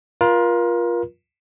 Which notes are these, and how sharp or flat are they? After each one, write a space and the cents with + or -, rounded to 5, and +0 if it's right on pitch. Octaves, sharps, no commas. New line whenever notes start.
F4 +0 A#4 +35